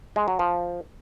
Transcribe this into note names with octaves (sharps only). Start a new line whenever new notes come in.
G#3
F#3
F3